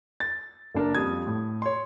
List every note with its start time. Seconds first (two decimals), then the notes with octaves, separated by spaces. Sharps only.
0.20 A6
0.74 F#1 D4 A#4
0.95 F2 G3 D#6 G#6
1.27 A2
1.62 C#5 C6